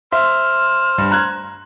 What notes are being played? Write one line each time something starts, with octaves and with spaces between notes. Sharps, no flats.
C5 E5 F6
G2
A#5 F#6 G#6